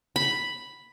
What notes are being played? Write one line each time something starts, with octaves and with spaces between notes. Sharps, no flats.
B5